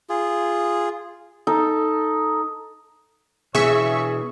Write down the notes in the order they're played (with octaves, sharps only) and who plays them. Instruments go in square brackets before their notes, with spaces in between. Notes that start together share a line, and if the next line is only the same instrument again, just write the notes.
[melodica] F4 G#4
[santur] D#4 A4
[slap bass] B2 E3 [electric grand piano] G#4 [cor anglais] C#5 [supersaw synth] E5 C#6